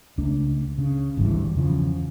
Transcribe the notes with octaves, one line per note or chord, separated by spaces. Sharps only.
C#2 A3 D4
C#3
G#1 D2 G2 E3
E2 C#3 E3 F3